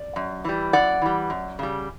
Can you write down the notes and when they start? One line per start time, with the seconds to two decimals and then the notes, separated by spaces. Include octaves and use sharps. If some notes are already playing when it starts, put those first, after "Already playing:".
Already playing: D5
0.16 F#2
0.45 E3 G3
0.73 F#2 D5 F#5
1.02 E3 G3
1.30 F#2
1.59 C#3 G3